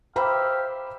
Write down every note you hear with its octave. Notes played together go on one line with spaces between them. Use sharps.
G4 C5 E5 F5 A#5 B5